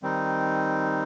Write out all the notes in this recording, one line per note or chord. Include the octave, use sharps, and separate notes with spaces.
D#3 G3 C4 D#4